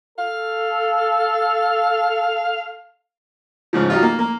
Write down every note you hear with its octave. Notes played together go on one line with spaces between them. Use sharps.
A4 F5
G#2 C#3 F3
F#3 G3 D#4 F4
A#3
A#3